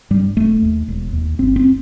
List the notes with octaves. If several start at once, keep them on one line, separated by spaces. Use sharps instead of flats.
G2 G3
E1 A3
D#2
E1
D#2
G1 C4
C4